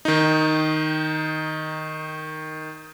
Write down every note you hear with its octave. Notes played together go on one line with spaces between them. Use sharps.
D#3 D#4